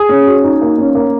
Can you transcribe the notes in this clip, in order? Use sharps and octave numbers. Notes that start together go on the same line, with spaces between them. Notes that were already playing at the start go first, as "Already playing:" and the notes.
Already playing: G#4
C#4
F#4
D#4
A#3
C#4
A#3